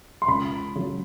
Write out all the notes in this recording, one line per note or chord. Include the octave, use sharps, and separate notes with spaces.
C6
C#2 B5
C#3 F#3